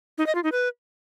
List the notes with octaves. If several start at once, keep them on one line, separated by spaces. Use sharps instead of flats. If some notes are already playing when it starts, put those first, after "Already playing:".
D#4
D#5
F4
D#4
B4